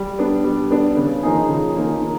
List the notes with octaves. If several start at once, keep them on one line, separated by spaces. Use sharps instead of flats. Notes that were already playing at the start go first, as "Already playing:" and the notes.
Already playing: G3
B3 D4
G3
B3 D4
C#3
F3 A#3 D#4 G#4
C#3
F3 A#3 D#4 G#4
A#3